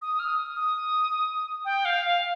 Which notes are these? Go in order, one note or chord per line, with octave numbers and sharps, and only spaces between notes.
D#6
F6
D#6
D#6
G5
F5
F5